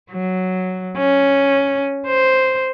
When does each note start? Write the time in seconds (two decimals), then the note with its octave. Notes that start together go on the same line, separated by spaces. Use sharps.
0.11 F#3
0.98 C#4
2.07 C5